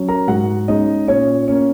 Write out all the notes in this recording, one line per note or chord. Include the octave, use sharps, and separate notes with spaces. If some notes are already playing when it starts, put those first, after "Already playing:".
Already playing: F#3 C#4
A#4 A#5
G#2 F#4 F#5
G#3 C#4 D#4 D#5
A#2 C#4 C#5
A#3 C#4